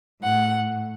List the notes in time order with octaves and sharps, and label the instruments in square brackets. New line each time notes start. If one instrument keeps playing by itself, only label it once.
[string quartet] A2 F#5